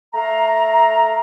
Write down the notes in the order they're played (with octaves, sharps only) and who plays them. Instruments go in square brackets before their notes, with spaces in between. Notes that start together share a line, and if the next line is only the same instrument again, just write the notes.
[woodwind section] A3 F5 A#5